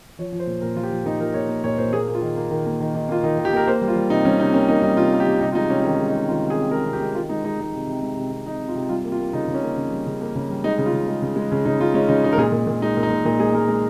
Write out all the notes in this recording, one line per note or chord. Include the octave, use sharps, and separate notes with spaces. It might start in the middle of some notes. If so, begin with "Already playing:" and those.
F3 C#5
F3
C5
A#2
A#2 A#4
F3 F4
G4
F3
A#2 D#4
F3 A#4
A#2 C#5
A#3
A#2 C#5
A#2 C5
A#3 G#4
A#3
F4
D#3
A#3
D#3
A#3
D#3
D#3
A#3 F4
D#3 D#4
D#3
G4
A#3 A#4
A#3 C5
G3
F4
G3
C3 D#4
G3 C#4
C3 D#4
A#3 C#4
A#3 D#4
G3 D#4
C3 F4
A#3
G4
G3
C3 D#4
F4
G#3 D#4
C3 C#4
D#4
D#3 C#4
G#3
D#4
G#3
D#3 F4
C3
G#4
C3
G#3 A#4
C3
G4
G#3
D#3 F4
G#3 D#4
G#3 D#4
G#3 D#4
C3
C3
G#3
C3
C3
C3 D#4
C3
F4
C3
G3 F4
A#3
F4
A#3
C#3 D#4
C#3
C#4
A#3
C#3
G3
C#3
A#3
C#3
G3
G#3 D#4
C#3
F4
C#3
G#3
C#3
G#3
C#3
C#3 D#4
G#3 F4
G#3 C#4
C#3 D#4
G#3 D#4
A#4
A#2 G#4
A#2
A#2
G#3 D#4
A#2
D#4
A#2
A#2 D#4
G#3 G#4
G#3 A#4
G#3